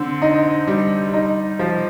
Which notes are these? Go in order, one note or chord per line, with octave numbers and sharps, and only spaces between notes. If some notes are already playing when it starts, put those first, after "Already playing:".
Already playing: D3 C4
D#4
G3
D#4
F3